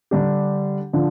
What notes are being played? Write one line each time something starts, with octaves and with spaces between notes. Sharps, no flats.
D3 G3 D4 G4
D3 F3